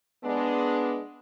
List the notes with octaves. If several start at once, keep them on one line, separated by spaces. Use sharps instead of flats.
G#3 B3 D4